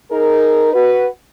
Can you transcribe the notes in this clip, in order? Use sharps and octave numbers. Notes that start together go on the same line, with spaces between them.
D#4 G#4 A#4
F#4 B4